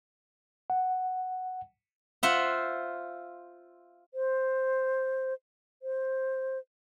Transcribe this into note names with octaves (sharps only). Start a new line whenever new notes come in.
F#5
F4 C5 E5 F#5
C5
C5